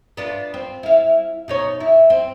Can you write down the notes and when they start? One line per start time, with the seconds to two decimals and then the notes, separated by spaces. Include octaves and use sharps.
0.17 B3 D4 F4
0.54 C4
0.83 E4 F5
1.48 B2 D#4 C#5
1.80 E4
2.10 C4